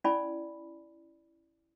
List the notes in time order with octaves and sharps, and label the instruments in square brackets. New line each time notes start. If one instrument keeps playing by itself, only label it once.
[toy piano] C#4 E4 D5 G#5 B5